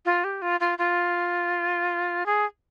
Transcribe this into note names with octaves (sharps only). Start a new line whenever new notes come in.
F4
G4
F4
F4
F4
G#4